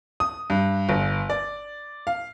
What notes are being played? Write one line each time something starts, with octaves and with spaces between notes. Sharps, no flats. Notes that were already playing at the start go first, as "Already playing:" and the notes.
D#6
G2
G1
D5
F5